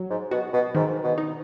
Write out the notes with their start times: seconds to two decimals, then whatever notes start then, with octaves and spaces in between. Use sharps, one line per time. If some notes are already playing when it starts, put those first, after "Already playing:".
Already playing: F#3
0.10 G#2
0.31 B2 F#4
0.53 B2
0.75 G#2 D#3
1.04 B2
1.18 D#4